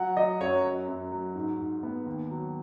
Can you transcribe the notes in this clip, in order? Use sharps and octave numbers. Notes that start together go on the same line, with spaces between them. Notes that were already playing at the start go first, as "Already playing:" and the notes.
Already playing: F#3 F#5
F#3 D#5
F#2 C#5
F#3
F#2
F#3
G#2
G#2
B3
D#2
F#3